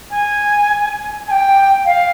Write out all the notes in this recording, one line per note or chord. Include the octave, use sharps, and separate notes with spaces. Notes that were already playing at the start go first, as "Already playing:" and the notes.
G#5
G#5
G5
F5